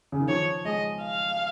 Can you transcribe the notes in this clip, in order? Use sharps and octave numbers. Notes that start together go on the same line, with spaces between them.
C#3
D#3
F3 C#5
G#3 D#5
F5